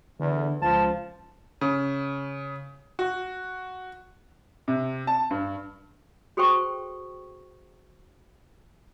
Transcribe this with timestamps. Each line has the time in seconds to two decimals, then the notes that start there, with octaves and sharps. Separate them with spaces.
0.20 E2 D3
0.62 C#2 F3 A5
1.61 C#3
2.99 F#4
4.68 C3
5.07 A5
5.31 G2
6.37 F#4 G#4 A4 C5 G5 C#6